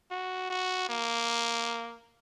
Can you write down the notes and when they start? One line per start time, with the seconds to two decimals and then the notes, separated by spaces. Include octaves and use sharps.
0.11 F#4
0.50 F#4
0.89 A#3